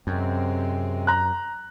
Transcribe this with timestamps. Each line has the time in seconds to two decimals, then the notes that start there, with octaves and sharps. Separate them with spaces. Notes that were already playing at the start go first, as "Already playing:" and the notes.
0.07 F#2 C3 G#3 C4
1.07 A#5 F#6